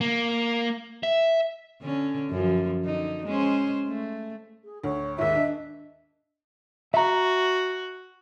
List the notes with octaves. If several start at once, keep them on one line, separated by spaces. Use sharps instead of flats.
A#3
E5
D3 C#4
F#2 F3
D3 D#4
G#3 C#4 C5
A3
G#4
D2 C#5
D#2 G#2 E5
D4 D#5
F#4 E5 A#5